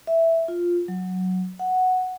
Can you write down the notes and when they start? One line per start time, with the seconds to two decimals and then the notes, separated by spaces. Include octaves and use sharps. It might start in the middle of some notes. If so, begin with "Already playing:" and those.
0.07 E5
0.48 F4
0.88 F#3
1.59 F#5